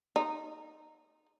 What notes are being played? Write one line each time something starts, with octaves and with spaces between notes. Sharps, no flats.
D#4